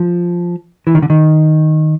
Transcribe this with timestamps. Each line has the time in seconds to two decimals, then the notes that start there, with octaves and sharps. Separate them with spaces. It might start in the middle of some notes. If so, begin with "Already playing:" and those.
Already playing: F3
0.87 E3
0.95 D#3
1.02 D3
1.10 D#3